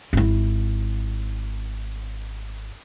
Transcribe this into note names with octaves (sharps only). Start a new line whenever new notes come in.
G#1 E4